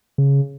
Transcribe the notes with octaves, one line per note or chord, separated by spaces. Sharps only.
C#3